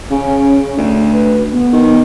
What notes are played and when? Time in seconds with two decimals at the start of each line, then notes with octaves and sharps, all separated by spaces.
0.10 C#3 C#4
0.78 D2
1.13 B4
1.52 B3
1.73 D#3